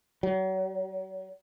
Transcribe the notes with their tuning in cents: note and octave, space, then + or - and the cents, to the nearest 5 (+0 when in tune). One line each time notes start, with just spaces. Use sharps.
F#3 +35